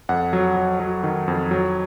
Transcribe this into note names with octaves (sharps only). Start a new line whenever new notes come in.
F2 F#5
F#3
F#3
F#3
D#3
F2
F#3